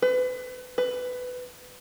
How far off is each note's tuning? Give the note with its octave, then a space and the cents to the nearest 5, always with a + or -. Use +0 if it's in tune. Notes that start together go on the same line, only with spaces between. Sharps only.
B4 +35
B4 +15